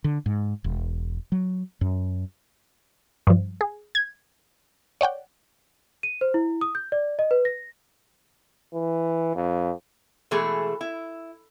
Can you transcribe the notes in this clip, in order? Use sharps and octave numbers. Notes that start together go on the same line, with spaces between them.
D3
G#2
E1
F#3
F#2
G2 F3
G#4
G#6
C#5 D5 F#5 G5
D#7
C5
E4
D#6
G6
D5
D#5
B4
A#6
E3
F2
B2 E3 G#3 A3 G#4 A4
E4